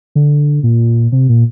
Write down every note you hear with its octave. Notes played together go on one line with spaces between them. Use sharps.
D3
A#2
C3
A#2